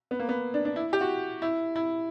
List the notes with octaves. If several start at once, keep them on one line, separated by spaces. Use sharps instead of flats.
B3
A#3
B3
D4
D4
E4
G4
F#4
E4
E4